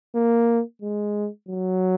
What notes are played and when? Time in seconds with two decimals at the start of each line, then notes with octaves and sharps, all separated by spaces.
0.15 A#3
0.82 G#3
1.49 F#3